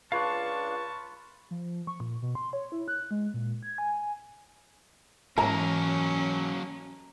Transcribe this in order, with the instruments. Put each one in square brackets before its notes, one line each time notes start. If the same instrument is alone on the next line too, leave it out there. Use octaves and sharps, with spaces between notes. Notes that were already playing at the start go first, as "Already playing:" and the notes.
[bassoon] C#2 [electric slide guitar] D4 F5 [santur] F4 B4 C#5 [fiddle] A5 C#6
[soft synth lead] F3
C#6
A#2
B2
C6
C#5
E4
F#6
G#3
A#2
G#6
G#5
[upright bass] G#2 E3 [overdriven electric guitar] F#3 A#3 [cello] C#4 [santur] A#5